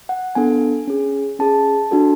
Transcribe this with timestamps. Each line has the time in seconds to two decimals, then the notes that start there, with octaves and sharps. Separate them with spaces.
0.09 F#5
0.35 B3 D4 A4 G#5
0.87 C#4 G#4
1.39 C#4 G#4 A5
1.91 D4 F#4 A4